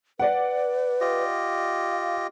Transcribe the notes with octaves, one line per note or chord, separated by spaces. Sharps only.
B4 D5 F#5
F4 G4 D#5
F5